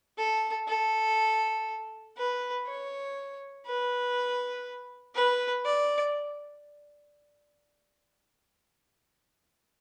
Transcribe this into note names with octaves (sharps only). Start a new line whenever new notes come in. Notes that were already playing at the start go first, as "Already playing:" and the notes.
A4
A4
B4
C#5
B4
B4
D5